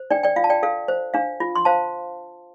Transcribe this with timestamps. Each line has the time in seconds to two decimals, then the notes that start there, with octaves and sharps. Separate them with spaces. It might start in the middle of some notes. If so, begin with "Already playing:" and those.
Already playing: C5
0.11 D4 D5 G5
0.23 D5 G5
0.36 F4 F5
0.44 A5
0.50 D5 G5
0.63 A4 F5
0.88 C5
1.14 D4 F5
1.40 F4
1.56 C6
1.65 C5 F5 A5